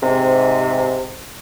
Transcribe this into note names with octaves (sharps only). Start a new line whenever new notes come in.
G#2 C3